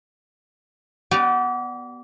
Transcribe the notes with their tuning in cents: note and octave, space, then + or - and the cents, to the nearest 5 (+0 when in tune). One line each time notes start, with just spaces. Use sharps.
B3 +0 G4 -30 D5 +5